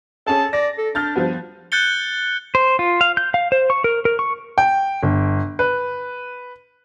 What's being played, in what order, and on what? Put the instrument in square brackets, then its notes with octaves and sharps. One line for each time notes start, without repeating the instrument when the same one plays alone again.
[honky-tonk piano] C#4 G#4 A4 [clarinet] A5
[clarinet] D5 [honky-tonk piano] A#6
[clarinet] A4
[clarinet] D4 [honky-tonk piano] F6 G6 A6
[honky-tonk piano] F3 G3 B3
[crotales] F#6 G6 A6 C#7 G7
[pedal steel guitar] C5
F4
F5
G6
F5
C5
C#6
A#4
A#4
C#6
[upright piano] G5
G1
B4